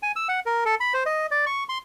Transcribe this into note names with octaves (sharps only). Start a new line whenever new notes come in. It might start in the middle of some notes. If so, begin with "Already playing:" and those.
G#5
E6
F#5
A#4
A4
B5
C5
D#5
D5
C#6
C6